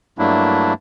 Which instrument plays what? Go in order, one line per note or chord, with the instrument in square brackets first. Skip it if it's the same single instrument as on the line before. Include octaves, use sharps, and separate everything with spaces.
[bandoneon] G2 F#3 A3 A#3 D4 E4